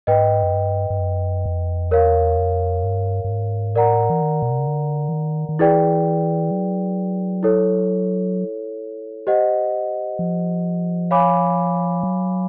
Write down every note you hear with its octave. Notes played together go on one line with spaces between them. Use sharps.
G#2 B4 D#5 G5
F#2
G2
G2
F#2
F2
E2 A#4 C#5 F5
F2
G2
G2
G#2
A2 A#4 D5 F#5 A#5
E3
D#3
B2
C3
C#3
D3
E3
D#3
D#3
E3 E4 G#4 B4 D5 G5
F#3
E4 A4 C#5
G4 C5 D#5 F#5
F3
C#5 F5 G#5 B5 D6
F#3